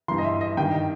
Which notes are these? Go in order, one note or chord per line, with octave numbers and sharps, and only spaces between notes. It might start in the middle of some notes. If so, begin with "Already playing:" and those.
G2 E3 C6
D#5
E5
D#5
G2 D#3 G5